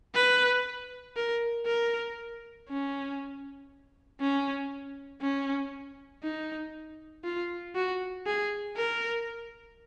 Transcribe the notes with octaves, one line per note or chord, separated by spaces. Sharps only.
B4
A#4
A#4
C#4
C#4
C#4
D#4
F4
F#4
G#4
A#4